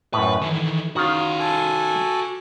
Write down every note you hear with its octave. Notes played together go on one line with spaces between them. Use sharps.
F#2 A2 B4
D#3 E3 A4
D#3 C#4 F4 F#4 F5
A4 G#5 D6